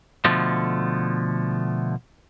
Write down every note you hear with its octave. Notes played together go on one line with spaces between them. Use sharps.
B2 D3 F3 A3